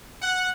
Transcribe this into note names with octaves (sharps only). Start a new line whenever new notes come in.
F#5